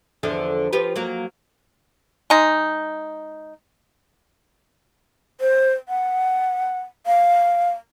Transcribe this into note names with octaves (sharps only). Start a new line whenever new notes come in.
E2 D3 F3
F3 G4 B4
F#3 A#3
G#3 D#4
C5
F#5
F5